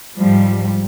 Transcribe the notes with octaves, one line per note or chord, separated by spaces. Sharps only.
G#2 F3 G3